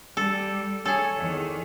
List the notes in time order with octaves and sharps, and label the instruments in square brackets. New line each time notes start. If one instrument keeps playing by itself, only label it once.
[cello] G3 [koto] A4
[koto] G#4 A4 [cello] C#5
[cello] E2 D#3